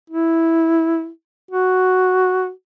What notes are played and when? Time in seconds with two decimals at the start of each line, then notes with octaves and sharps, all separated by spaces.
0.10 E4
1.51 F#4